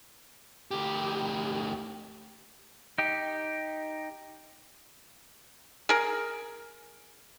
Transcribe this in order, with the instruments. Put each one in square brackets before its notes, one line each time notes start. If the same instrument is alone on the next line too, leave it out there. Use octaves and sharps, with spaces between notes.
[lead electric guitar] D2 G4
[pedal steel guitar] D#4 G4
[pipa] G#4 A#4